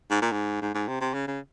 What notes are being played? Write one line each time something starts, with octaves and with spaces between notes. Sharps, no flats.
G#2
A#2
G#2
G#2
G#2
C3
C3
C#3
C#3